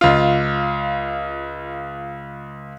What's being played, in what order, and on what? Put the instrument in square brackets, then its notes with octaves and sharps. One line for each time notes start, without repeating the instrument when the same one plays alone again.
[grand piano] C#2 F4